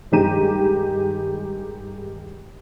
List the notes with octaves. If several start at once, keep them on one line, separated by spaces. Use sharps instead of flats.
G2 D#3 G#3 G4 A#5 D#7